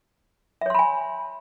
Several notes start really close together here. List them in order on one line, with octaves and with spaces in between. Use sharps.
E5 C#5 C6 B5 G#5